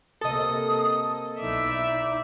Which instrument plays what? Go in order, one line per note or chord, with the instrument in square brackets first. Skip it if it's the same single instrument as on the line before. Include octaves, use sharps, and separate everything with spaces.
[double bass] C3 A#3 [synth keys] A4 D#5 [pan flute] D#6
[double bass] B1 E4 [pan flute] D#4 [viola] D5 E5